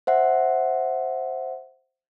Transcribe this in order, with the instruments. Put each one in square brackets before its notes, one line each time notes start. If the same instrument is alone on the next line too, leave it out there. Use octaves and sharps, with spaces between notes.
[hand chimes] C5 E5 F#5